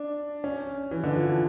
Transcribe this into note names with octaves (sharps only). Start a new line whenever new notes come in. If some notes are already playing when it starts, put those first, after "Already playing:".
Already playing: D4
C#4
E3
D3
F3
E3